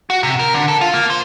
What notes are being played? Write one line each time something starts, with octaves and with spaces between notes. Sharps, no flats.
F#4
C3
A#4
D3
A4
F4
A#3
C5